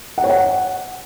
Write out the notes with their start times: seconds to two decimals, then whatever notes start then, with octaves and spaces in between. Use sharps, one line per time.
0.18 F#5
0.24 C#5
0.30 F#5